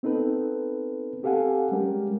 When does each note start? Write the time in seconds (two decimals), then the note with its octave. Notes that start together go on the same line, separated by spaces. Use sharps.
0.03 B3 C4 D#4 A4 B4
1.23 C4 G4 A4 F5 F#5 G#5
1.72 G3 G#3 C#4 G4 A#4